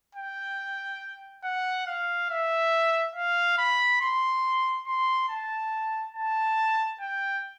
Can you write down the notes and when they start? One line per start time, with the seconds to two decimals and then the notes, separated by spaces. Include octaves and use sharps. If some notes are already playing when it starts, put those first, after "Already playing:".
0.15 G5
1.43 F#5
1.87 F5
2.30 E5
3.15 F5
3.58 B5
4.01 C6
4.87 C6
5.29 A5
6.15 A5
7.00 G5